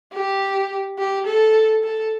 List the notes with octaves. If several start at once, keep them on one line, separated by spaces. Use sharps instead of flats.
G4
G4
A4
A4